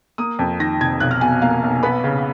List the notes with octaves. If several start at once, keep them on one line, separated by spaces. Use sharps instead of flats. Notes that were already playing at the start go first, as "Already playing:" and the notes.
A#3 D#6
F2
D#3 A#6
F1 G#6
B1 F#6
F6
B2 G#5
A#3 F5
B1
B3 B5
C#3